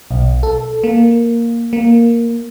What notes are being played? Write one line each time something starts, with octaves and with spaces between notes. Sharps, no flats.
B1
A4
A#3
A#3